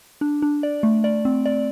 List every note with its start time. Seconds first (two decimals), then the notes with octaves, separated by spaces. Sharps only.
0.21 D4
0.42 D4
0.63 D5
0.83 A3
1.04 D5
1.25 C4
1.46 D5